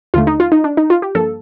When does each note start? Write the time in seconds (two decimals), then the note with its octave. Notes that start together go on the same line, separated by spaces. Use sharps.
0.14 D#2 D3 A3 F4
0.27 D#4
0.40 F4
0.52 D#4
0.64 D4
0.77 D#4
0.90 F4
1.02 G4
1.15 G2 F3 A#3 A4